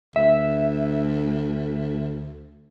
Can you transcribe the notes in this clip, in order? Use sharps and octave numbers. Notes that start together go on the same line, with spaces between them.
D2 E5